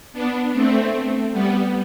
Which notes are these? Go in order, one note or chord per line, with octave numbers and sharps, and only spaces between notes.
B3 D4
A3 C4
G3 B3